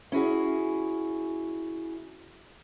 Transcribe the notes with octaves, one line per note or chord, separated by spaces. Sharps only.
C#4 E4 F#4 G#4